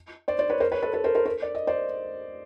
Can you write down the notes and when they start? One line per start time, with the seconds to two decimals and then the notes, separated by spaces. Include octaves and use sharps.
0.28 C5 D5
0.39 C5 D5
0.49 B4 C#5
0.60 A#4 C5
0.71 B4 C#5
0.82 A4 B4
0.93 A4 B4
1.04 A#4 C5
1.15 A#4 C5
1.26 A#4 C5
1.42 D5
1.55 D#5
1.67 C5 D5